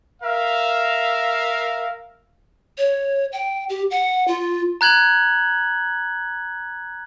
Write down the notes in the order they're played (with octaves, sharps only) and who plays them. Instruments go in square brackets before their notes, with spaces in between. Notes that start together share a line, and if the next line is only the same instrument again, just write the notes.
[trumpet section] A#4 E5 F5
[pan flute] C#5
G5
G4
F#5
F4
[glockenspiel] A#5 F#6 G#6 F#7